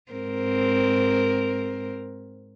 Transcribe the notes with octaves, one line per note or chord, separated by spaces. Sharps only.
G#2 C4 A#4